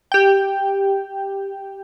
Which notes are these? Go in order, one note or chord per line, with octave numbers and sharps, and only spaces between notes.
G4 G5